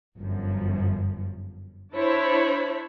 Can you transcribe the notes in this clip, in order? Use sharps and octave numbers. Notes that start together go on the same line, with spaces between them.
G1 F#2 F3
D4 E4 C5 C#5 A5 B5